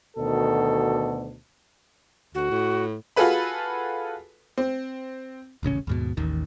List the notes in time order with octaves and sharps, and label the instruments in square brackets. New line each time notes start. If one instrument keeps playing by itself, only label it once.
[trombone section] D2 B2 D#3 A4
[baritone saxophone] D2 [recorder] F#4
[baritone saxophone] A2
[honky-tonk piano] F4 F#4 G#4 A4 B4 B5
C4
[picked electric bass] D#1 A1 C#3 C#4
D#2 G#2 B2
A1 D#2 D#3